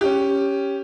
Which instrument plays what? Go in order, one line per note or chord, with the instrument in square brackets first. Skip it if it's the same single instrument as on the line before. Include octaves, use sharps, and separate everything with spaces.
[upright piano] C#4 G4